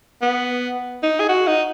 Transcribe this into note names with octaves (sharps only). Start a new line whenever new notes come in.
B3
D#4
G#4
F#4
D#4